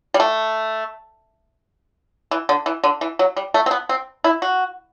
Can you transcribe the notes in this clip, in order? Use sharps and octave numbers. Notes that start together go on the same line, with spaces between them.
G3
A3
E3
D3
E3
D3
E3
F#3
G3
A3
C4
B3
C4
E4
F#4